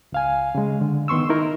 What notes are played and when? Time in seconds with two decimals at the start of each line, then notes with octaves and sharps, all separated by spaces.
0.12 C#2 F5 G#5
0.55 C#3 G#3
0.81 D3
1.08 D#3 B3 C6 C#6 E6
1.29 D#4 E4 A#4